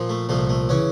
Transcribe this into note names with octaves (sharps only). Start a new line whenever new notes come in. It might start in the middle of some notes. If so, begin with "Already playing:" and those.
Already playing: A#2 F3
A3
C2 A#2 F3 A3
A3
C#3 E3 C#4